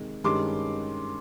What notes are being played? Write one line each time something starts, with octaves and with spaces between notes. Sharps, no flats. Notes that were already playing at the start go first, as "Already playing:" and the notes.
Already playing: C3 D#3 G#3
G2 D#3 G#3 C#4 C6 D6